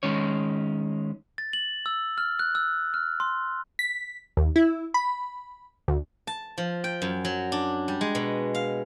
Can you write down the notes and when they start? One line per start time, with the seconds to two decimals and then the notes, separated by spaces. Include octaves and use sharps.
0.03 D#3 G#3 C#4 C#5
1.38 A6
1.53 F#7
1.86 E6
2.18 F6
2.39 F#6
2.55 E6
2.94 F6
3.20 C6
3.79 B6
4.37 D#2
4.56 E4
4.94 B5
5.88 D2
6.27 A5
6.58 F3
6.84 G5
7.02 F#2
7.25 F#3
7.52 D4
7.88 G3
8.01 G#3
8.15 B2
8.55 F5